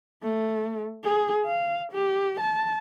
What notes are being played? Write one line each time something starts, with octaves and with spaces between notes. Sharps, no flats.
A3
G#4
F5
G4
A5